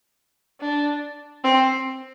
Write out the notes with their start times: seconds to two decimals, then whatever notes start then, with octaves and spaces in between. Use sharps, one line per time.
0.61 D4
1.44 C4